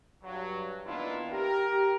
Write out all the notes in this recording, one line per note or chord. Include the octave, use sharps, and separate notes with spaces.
G2 F#3
D#3 A#3 B3 D4 E4 F4
G4 A#4